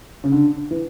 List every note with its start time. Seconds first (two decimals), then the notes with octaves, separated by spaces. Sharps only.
0.24 C#3
0.32 D3
0.71 E3